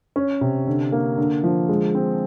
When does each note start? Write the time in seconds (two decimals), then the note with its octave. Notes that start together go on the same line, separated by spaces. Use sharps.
0.16 C#4
0.41 C3
0.67 D3
0.92 A#3
1.18 D3
1.43 F3
1.69 G#3
1.95 C4